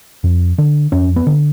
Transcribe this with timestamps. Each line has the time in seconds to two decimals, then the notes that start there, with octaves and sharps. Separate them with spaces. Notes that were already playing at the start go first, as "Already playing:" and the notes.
0.24 F2
0.58 D3
0.92 F2 C#4
1.16 B3
1.27 D3